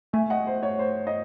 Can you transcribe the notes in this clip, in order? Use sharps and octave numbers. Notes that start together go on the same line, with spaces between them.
A3 E5 G#5
D#5 F#5
C5
C#5
C5
D#5